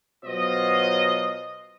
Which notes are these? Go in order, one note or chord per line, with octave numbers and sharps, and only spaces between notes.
B2 F#3 F4 C5 D#5